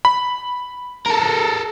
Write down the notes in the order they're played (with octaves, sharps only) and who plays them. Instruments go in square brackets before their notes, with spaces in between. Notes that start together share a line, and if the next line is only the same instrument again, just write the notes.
[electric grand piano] B5
[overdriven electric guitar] A4 A#4